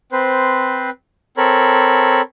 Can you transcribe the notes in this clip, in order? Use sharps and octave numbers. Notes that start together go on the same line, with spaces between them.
C4 B4 C5
C4 A4 A#4 C#5 B5